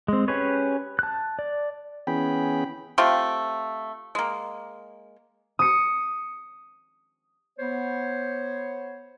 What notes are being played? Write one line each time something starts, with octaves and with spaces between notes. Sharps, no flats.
G#3 C4
C#4 G4 G#4 B4 C#5
A5 F#6
D5
E3 B3 C#4 G#4 G5 B5
A3 C4 F4 G4
G#3 A#3
D#6 C#7
B3 C5 C#5